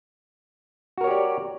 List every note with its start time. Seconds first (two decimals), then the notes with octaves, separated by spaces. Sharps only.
0.98 F#4
1.01 A#4
1.04 C#5
1.07 G4
1.11 D5